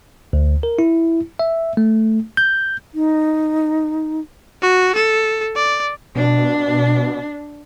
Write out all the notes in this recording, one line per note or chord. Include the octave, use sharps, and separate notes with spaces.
D2
A#4
E4
E5
A3
G6
D#4
F#4
A4
D5
B2 D4